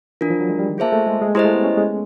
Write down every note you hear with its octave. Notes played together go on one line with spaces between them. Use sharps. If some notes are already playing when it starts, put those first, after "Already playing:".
E3 D4 F4 A#4
F3
F#3
G#3
G3
D#3
A#3 F4 G#4 C5 E5 A5
A3
G#3
G#3
G#3 E4 G4 C5 D#5
A3
B3
C#4
G#3